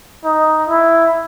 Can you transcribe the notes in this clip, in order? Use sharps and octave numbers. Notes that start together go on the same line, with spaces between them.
D#4
E4